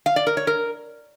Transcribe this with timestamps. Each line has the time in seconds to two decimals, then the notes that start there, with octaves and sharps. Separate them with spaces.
0.06 F5
0.16 D5
0.27 A#4
0.37 C#5
0.47 A#4